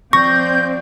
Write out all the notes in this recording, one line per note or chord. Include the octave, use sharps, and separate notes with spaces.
F3 C4 D5 C#6 G6 A#6